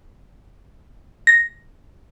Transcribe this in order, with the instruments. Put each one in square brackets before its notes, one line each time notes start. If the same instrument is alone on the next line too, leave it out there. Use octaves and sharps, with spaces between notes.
[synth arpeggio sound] A#6